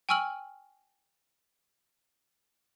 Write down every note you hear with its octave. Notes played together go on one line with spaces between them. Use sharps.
G5 G#5 C#6 E6 F6 F#7